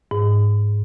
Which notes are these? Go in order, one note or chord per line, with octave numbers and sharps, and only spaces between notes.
G#2